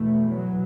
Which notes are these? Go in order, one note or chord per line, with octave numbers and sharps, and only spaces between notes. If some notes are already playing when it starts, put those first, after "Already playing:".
Already playing: E2 B2 A3
F#3